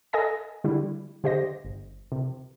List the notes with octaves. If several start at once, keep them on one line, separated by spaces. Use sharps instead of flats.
A4 D#5 G#5 A#6
D3 G3 E4
D3 G4 C5 D#5 A#6
G1
C3